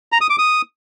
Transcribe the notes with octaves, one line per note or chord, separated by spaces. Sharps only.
A#5
D#6
D6
D#6